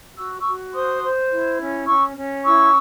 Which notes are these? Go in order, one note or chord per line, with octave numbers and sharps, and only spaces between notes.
F#4 E6
F#4 C#6 E6
C5 C6 D#6
C5
E4
C#4
C#4 C#6 E6
C#4
E4 C#6 E6